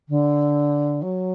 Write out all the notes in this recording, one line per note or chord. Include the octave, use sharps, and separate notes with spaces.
D3
F#3